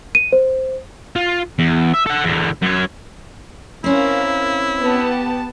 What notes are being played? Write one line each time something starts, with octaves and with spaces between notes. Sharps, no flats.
D#7
C5
F4
E2
E5
A4 F#5
E2 D3
F#2 C#5
C4 C#4 E4 A#4 F5
B3 G4 A5